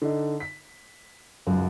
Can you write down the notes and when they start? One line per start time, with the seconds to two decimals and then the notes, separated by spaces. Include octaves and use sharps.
0.02 D3 D#4
0.40 B6
1.47 C#2 F#2